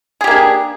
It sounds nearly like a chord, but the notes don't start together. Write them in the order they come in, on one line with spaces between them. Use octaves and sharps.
G#4 G4 A#3 D4